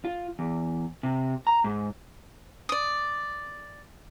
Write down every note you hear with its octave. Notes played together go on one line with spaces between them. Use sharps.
F4
E2
C3
A#5
G#2
D5 D#6